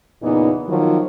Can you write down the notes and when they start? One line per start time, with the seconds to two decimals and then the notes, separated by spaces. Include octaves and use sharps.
0.23 E2 A#2 C#3 E3 B3 D#4
0.69 D#3 F3 F#3